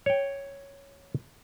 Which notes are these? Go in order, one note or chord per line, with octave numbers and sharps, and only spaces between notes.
C#5 G5